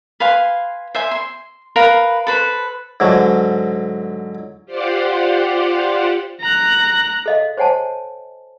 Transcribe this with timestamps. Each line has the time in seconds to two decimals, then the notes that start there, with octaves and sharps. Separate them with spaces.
0.20 B4 F5 G#5 C6
0.95 C5 E5 G#5
1.11 C6
1.76 A#4 B4 F5 B5
2.27 A4 B4 C5
3.00 G#2 D3 F#3
4.65 F4 G4 C5 D5 F5 F#5
6.41 A#5 F#6
7.26 A4 D#5 F5
7.57 C5 C#5 F#5 G#5 A5